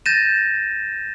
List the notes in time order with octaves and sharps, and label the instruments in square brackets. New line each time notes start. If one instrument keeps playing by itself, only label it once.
[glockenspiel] G6 A6 A#6 D#7 E7